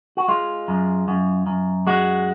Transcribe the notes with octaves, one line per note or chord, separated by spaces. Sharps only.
F#4
G#3 F4
F#2
F#2
F#2
G#3 F#4